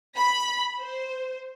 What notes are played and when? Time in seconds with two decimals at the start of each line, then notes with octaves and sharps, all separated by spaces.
0.16 B5
0.79 C5